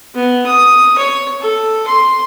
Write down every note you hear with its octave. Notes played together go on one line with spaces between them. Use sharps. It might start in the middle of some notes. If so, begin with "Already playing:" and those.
B3
D#6
C#5
A4
C6